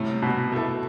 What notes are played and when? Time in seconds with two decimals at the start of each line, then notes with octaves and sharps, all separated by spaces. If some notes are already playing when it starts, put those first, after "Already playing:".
Already playing: A2 C3 G3
0.22 B2
0.52 A3 E4 A4